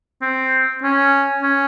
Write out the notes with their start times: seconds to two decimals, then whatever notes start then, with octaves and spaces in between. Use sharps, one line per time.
0.22 C4
0.82 C#4
1.42 C#4